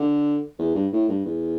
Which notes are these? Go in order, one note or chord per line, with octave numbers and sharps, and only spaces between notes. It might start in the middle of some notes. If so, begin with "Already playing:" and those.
Already playing: D3
E2
G2
A2
G2
E2